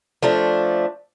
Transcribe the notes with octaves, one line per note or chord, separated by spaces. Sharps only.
F3 A3 D4